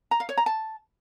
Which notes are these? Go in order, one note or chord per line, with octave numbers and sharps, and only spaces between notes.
A#5
F5
C#5
A#5
A5